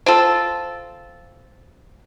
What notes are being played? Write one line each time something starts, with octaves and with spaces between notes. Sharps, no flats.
C4 F4 A4